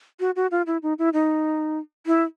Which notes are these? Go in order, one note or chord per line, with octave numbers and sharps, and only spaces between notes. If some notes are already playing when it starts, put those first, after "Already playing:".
F#4
F#4
F4
E4
D#4
E4
D#4
E4